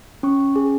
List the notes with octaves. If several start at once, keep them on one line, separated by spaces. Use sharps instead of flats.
C#4 C#6
G#4